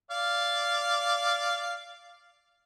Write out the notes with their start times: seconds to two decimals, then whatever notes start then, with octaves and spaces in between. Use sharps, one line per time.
0.11 D5 F5